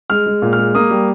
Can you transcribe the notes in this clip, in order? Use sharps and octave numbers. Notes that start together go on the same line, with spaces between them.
G#3 F6
G#3
A#2
F6
G#3
A#3 D#6
G3